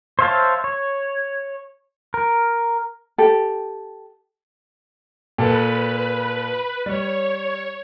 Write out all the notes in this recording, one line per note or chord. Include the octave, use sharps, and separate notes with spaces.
C5 C#5 E5 F5 A5
C#5
A#4
G4 A4
A#2 A4 B4 A5
G3 C#5